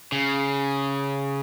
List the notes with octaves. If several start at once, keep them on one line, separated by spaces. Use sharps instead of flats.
C#3